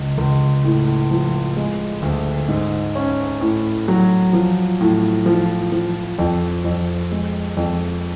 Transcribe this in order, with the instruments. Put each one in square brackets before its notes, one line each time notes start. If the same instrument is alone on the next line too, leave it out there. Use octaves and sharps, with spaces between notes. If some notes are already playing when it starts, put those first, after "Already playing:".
Already playing: [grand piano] C#2
C#2
A2
F3
G#3
D2
G#2
C#4
A2
F#3
F3
A2
F3
F3
F2
F2
G#3
F2